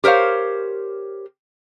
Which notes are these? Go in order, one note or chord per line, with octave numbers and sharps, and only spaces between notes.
G4 A#4 C5 C#5 F5